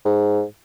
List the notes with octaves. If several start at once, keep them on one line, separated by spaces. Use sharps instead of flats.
G#2